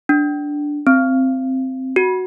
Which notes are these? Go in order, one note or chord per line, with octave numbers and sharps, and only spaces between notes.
D4
C4
F#4